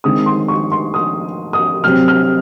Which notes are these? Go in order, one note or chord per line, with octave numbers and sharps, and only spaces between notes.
D#3 G#3 C4 D#6
C6
C#6
C6
D#6
D#6
C3 F#3 C4 F6
F6